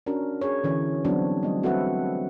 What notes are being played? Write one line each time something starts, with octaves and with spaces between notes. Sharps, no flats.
C#4 D4 F#4 A#4
G#4 C#5
D3 E3 C#4
F#3 G3 B3 C4 D4 F#4
G3 A3 D#5
C4 F#4 A4 B4 E5 F#5